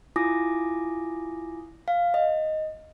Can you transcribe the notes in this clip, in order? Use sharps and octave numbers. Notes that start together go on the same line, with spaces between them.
E4 F4 G#5 D6 D#6 A#6
F5
D#5